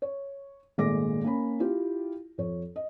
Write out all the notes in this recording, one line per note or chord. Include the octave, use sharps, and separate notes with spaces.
C#5
G#1 A#2 G#3 A3 D6 A#6
A#3 C#4 B5
E4 F4 G4
F2 C#5
D#5